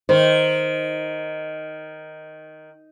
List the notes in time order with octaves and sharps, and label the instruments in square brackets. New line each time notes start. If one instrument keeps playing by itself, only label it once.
[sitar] D#3 [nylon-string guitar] C5